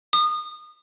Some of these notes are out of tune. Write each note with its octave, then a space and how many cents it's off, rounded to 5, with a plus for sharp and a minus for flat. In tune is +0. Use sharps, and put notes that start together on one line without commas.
D#6 -30